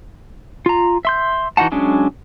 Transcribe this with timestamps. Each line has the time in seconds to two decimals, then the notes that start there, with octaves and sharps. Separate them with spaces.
0.66 F4 A#5
1.05 E5 C6 G6
1.57 E3 D#4 F#4 F#5 A5
1.72 F#3 G#3 C#4 D4